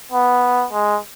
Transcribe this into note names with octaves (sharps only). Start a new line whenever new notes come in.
B3
G#3